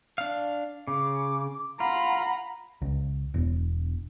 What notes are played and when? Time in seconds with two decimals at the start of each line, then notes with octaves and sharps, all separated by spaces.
0.18 D4 F5
0.87 C#3 D6
1.80 F4 F#5 A#5 B5
2.82 C#2
3.34 E1